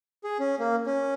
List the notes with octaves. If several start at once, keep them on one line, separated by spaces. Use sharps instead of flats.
G#4
C#4
A#3
C#4